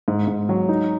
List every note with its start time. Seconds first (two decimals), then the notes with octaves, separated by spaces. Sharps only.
0.08 G#2
0.28 G#2
0.49 F#3
0.69 D#4